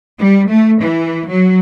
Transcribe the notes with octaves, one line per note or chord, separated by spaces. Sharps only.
G3
A3
E3
F#3